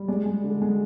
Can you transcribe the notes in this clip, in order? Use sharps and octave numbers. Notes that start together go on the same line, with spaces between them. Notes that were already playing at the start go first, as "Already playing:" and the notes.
Already playing: G3
G#3 D5
G#3
D3
G#3